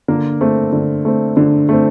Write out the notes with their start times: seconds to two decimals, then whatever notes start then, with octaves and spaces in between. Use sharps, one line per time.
0.08 D3 A#3 A#4
0.41 A3 C4
0.73 D3
1.05 A3 C4
1.37 D3
1.69 A3 C4